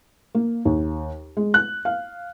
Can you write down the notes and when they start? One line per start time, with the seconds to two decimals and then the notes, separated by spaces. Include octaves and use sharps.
0.35 A#3
0.65 D#2
1.37 G#3
1.54 F#6
1.85 F5